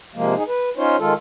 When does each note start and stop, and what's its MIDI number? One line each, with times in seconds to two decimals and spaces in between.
0.15 0.35 48
0.15 0.35 53
0.15 0.35 56
0.15 0.35 58
0.36 0.43 63
0.36 0.43 68
0.48 0.69 71
0.77 0.96 61
0.77 0.96 63
0.77 0.96 65
0.77 0.96 72
0.77 0.96 73
0.99 1.14 51
0.99 1.14 56
0.99 1.14 65
0.99 1.14 69